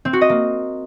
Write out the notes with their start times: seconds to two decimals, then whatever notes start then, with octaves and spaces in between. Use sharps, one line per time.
0.05 C4
0.13 F#4
0.21 D#5
0.29 A#3